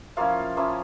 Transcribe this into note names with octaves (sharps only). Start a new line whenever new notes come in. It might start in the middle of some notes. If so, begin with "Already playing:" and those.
F3 A#3 C#4 E4 F4 F5
F3 A#3 C#4 E4